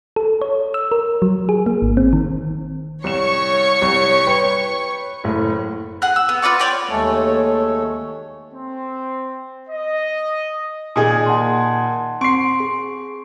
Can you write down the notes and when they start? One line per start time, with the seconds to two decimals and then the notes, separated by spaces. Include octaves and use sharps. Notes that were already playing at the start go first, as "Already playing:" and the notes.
0.16 A4
0.42 C#5
0.74 E6
0.92 A#4
1.22 F#3
1.49 G#4
1.66 A#3
1.82 G#1
1.97 C4
2.13 D#3
3.04 C2 C#5 C#6 E7
3.82 C2
4.27 B4 G5 B5
5.24 F#1 A2
6.02 G#4 F#5 F#6
6.16 E6
6.29 B3
6.42 F4 B4 D5 C#6
6.59 C#5 D5 G5
6.89 D#2 G#3 A3 A4 C#5
8.53 C4
9.69 D#5
10.96 A#2 D#3 A#3 G#4 D#5 D#6
11.26 F#5 A5 C6
12.21 C4 C6 C#6 C7 D7
12.60 G#4